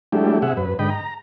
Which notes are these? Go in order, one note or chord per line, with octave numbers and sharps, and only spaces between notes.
F#3 G#3 A3 D4 E4 G4
C3 G#4 E5 F#5
F#2 B4
G#2 D3 D#5 G5 B5
A#5